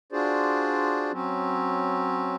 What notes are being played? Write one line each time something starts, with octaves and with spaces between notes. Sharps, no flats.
D4 F4 F#4 G#4 C5 D5
F#3 C4 C#4